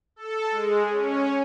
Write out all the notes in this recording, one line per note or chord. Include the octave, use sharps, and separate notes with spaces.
A4
G#3
C#4